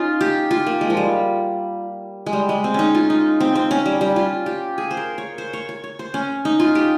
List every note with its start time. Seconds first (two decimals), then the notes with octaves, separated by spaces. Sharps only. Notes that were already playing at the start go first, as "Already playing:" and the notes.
Already playing: C#4 D#4 F4
0.21 G4
0.51 F4
0.66 A#3
0.81 G#3
0.90 F3
0.97 G3
2.26 G#3
2.33 G3
2.49 G#3
2.64 C4
2.74 C#4 D#4
2.95 F4
3.10 D#4
3.40 C4
3.55 C4
3.71 C#4
3.86 G3
4.01 G3
4.16 F4
4.46 G4
4.78 G#4
4.91 C5
4.97 A#4
5.18 C#5
5.38 C5
5.53 C#5
5.69 C#5
5.84 C#5
5.99 C5
6.14 C#4
6.45 D#4
6.60 F4
6.75 G4